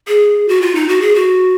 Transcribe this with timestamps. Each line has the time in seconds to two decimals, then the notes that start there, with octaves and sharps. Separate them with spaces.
0.08 G#4
0.48 F#4
0.62 F4
0.75 D#4
0.88 F#4
1.01 G#4
1.15 F#4